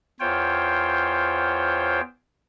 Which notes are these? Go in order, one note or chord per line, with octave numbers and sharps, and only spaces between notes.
E2 F4 C5 C#5 G5